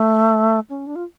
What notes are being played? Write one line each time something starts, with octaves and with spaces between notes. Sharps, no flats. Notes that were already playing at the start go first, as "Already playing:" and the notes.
Already playing: A3
C#4
D4
F4